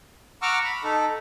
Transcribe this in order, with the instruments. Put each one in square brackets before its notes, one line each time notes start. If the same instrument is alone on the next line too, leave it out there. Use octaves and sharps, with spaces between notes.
[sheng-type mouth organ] F#5 A#5 C#6 D6 E6 F6
B5
D#4 A4